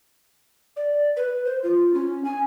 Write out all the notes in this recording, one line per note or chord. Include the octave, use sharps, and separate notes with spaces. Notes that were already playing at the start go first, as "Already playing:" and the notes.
D5
B4
C5
F4
C#4
G#5